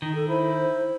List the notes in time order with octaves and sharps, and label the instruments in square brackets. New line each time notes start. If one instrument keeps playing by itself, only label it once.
[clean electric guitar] D#3 [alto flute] D#4
[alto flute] A4
[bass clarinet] E4 [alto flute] C5